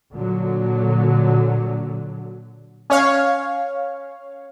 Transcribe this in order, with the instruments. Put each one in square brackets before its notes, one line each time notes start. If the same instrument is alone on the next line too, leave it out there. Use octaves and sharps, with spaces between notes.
[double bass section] A#2 D3 F#3
[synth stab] C#4 C#5 F5